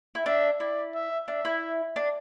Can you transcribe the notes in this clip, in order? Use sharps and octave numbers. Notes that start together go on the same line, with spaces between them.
E4
D4 E5
E4 D5
E5
D4 E5
E4
D4